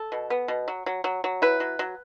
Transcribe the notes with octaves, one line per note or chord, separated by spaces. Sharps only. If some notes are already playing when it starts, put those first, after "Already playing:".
Already playing: A4
B2
B3
B2
F#3
F#3
F#3
F#3
E4 B4
F#3
F#3